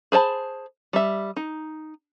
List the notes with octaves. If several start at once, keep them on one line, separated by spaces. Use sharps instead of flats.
G#4 C5 D5 A5 B5
G3 E5
D#4